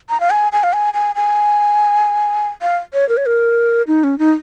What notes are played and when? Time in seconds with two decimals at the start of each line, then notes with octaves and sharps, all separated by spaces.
0.10 A#5
0.20 F5
0.30 G#5
0.52 G#5
0.63 F5
0.73 G#5
0.94 G#5
1.15 G#5
2.62 F5
2.94 C#5
3.09 A#4
3.17 C#5
3.27 A#4
3.87 D#4
4.04 C#4
4.19 D#4